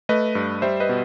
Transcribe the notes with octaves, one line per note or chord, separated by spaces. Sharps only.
A3 B4 D#5
G2
G3 C5 E5
B4 D#5
B2